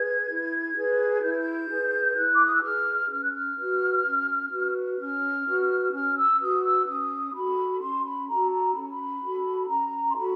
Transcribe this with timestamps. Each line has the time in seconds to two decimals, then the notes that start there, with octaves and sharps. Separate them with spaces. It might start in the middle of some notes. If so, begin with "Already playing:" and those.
Already playing: G#4 B4 G#6
0.28 E4
0.75 G#4 B4
1.22 E4 G6
1.30 G#6
1.38 G6
1.69 G#4 B4
2.16 E4 F#6
2.35 D6
2.44 D#6
2.53 E6
2.63 G#4 B4 F6
3.10 C#4 F6
3.21 F#6
3.33 F6
3.57 F#4 B4
4.04 C#4
4.51 F#4 B4
4.99 C#4 F6
5.45 F#4 B4
5.93 C#4 F6
6.17 E6
6.40 F#4 B4 D#6
6.64 E6
6.86 C#4 D#6
7.34 F#4 A4 B5
7.81 C#4 C6
8.04 B5
8.28 F#4 A4 A#5
8.51 A#5
8.74 C#4 B5
8.82 A#5
8.90 B5
9.23 F#4 A4
9.69 C#4 A#5
10.10 C6
10.16 F#4 A4 B5